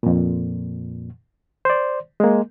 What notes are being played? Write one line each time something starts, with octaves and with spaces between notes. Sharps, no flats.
F2 A#2
C5 D5
G#3 A#3